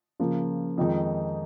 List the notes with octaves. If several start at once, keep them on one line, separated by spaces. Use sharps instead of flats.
C#3 F3 A#3
F2 D#3 G#3 D#4